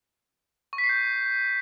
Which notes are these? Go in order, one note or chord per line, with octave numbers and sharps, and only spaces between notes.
C#6
B6
C7
G6